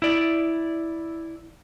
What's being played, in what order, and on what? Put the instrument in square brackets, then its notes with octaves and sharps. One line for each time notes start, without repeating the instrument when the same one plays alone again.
[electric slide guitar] E4 D5